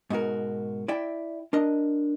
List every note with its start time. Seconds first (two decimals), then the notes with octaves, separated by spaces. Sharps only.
0.10 G#2 B2 F#4 A#4
0.88 E4 D5 E5 G5
1.53 D4 A#4 D#5